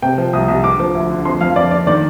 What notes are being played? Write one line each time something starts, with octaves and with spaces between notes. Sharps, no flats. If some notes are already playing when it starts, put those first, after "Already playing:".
C3 G5
F3
C2 D#6
C2
D3 D6
F3
D2
D3
F2 C6
F2 F5
F2 D5
D3 D5
D#3 D5